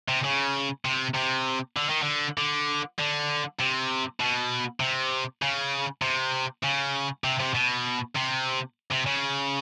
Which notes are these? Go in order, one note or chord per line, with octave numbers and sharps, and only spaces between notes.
C3
C#3
C3
C3
D3
D#3
D3
D3
D3
C3
B2
C3
C#3
C3
C#3
C3
C3
B2
C3
C3
C#3